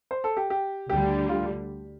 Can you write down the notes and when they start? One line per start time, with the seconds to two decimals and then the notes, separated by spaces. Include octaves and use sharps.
0.11 C5
0.24 A4
0.37 G4
0.50 G4
0.89 D2 D3 G3 G4
1.29 F4